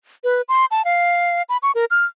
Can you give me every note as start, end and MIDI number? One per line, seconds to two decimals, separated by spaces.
0.24 0.42 71
0.49 0.65 84
0.71 0.85 81
0.85 1.42 77
1.49 1.57 83
1.63 1.72 85
1.75 1.85 70
1.91 2.05 89